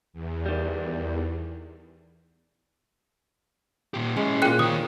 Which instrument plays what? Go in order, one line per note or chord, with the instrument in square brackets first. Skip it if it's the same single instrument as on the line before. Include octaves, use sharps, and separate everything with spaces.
[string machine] E2
[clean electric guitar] D#3 G3
[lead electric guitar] A#2 G4
[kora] G#3 [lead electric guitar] C#4 E4
[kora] A#2 C5 [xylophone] G#4 G5 F#6
[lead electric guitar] D#3 C#5 [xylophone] D#6